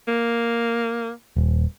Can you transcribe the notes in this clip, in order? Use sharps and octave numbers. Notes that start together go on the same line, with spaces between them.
A#3
D#1